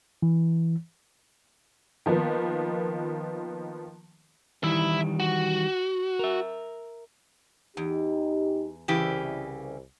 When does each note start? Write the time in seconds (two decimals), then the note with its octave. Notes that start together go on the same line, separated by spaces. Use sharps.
0.22 E3
2.06 D#3 F3 A#3 B3
4.64 D#3 E3 G3 E4 E5
5.20 F#4
6.19 A#4 E5
7.77 E2 D#4 G4
8.88 C2 C#3 E3 G4